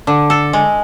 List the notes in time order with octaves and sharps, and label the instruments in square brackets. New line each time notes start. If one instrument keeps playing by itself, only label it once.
[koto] D3
A4
G#3